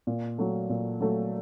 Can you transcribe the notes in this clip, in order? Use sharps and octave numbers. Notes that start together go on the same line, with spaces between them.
A#2
F#3 A3
A#2
F#3 A3